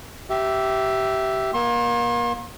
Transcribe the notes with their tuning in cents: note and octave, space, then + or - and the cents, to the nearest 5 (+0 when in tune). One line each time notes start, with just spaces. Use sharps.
G4 -20 E5 +0
A#3 +30 C6 +40